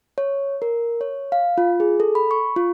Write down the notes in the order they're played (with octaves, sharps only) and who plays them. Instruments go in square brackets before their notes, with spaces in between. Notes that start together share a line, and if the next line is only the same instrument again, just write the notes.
[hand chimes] C#5
A#4
C#5
F5
F4
G#4
A4
B5
C#6
F4